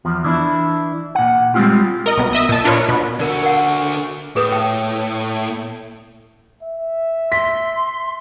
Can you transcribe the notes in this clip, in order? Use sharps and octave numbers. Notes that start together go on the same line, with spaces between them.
E2 F3
E3 D4 E4
A#2 F#5
G3 G#3 A#3 C4 F4 G4
A#4 D#5
B1 B3
D#5 E5 D#6
A#2 A5
D4 F4 A#4 B4 C#5 D#5
B2 B4
D3 F#4 A#4 D5
A#4 F#5
A2 G#4 B4 D#6
G5
E5
C6 B6